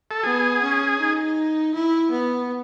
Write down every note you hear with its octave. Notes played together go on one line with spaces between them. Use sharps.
A4
B3 G#4
C#4
D#4
E4
B3